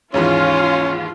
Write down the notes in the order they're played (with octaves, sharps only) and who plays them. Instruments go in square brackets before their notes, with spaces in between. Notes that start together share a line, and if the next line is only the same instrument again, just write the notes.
[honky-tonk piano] D#2 G#2 E3 [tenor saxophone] C#4 [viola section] F4